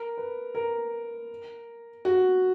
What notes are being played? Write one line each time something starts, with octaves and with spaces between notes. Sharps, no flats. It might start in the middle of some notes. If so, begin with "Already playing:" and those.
Already playing: A#4
B4
A#4
F#4